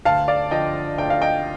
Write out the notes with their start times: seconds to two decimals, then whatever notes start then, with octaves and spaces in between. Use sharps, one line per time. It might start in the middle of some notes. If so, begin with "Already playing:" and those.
0.05 D2 F5 A5
0.28 D5 F5
0.51 D3 F3 D#5 G5
0.98 D2 G5
1.10 F5
1.21 D#5 G5